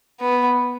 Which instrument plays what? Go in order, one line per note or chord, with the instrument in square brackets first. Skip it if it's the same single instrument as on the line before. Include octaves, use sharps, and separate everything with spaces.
[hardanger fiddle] B3